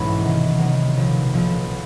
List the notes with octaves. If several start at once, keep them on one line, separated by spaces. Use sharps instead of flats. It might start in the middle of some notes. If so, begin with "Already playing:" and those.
Already playing: B1 G#2 E3 G#3 A#3 C#4 E4
C3 D#3 F#3
C3 D#3 F#3
B1 A#2 F3
B1 A#2 F3